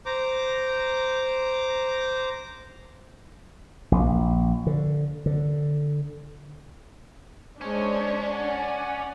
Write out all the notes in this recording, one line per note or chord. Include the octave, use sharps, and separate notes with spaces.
C5 A#5 D6
A#1
D3
D3
G#3 C#4 D4 C5 C#5
D5 F#5